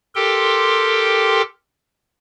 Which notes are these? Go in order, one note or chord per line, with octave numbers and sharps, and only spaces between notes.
G4 A4 A#4 G5 C6